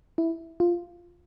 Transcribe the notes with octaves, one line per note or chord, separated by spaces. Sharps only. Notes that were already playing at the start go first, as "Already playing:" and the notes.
E4
F4